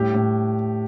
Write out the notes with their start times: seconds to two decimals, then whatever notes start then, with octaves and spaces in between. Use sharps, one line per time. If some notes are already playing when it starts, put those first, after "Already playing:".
Already playing: A2 G3 G4
0.14 A2